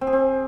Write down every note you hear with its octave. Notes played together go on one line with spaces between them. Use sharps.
C4
G#4
C4